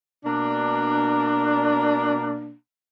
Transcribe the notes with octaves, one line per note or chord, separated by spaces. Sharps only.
B2 A#3 D4